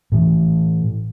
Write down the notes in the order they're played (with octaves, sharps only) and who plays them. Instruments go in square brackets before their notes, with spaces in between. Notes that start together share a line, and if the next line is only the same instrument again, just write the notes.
[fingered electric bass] A2 E3